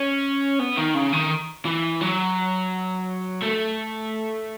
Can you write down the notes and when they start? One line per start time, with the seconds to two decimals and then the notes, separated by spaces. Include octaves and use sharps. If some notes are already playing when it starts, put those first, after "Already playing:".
Already playing: C#4
0.59 B3
0.77 D#3
0.95 C#3
1.13 D#3
1.66 E3
2.01 F#3
3.42 A3